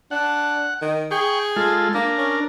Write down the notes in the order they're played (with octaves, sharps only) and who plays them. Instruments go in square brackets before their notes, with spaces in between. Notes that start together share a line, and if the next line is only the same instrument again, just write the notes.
[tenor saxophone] D4 [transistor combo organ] F#5
[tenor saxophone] D#3
[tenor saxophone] G#4 [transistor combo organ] G5 C#6
[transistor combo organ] G#3 F4 A4
[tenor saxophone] A#3 [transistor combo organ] D4 A#4
[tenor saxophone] C#4